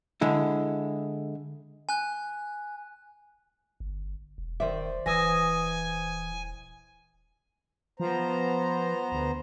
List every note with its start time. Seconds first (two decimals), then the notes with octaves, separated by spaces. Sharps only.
0.21 D3 G#3 E4
1.89 G#5 F#6
3.80 G1
4.38 E1
4.60 D#3 C5 D5 E5
5.06 D#1 E3 G#5 D#6 E6 A#6
8.00 F3 B3 C5 A#5
9.12 D2